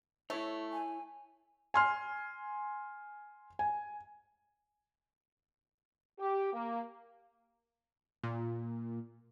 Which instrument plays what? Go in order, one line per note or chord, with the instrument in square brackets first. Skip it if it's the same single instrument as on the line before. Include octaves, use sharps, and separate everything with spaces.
[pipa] A3 [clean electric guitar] E4 C#5
[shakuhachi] G#5
[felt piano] G#5 C6 F6
G#5
[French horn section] G4
A#3
[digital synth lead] A#2